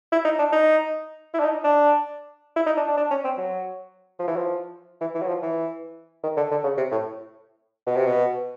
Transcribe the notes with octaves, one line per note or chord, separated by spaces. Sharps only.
E4
D#4
D4
D#4
E4
D4
D#4
D4
E4
D#4
D4
D4
D4
C#4
C4
F#3
F3
E3
F3
E3
E3
F#3
F3
E3
D#3
D3
D3
C#3
C3
A2
B2
C3
B2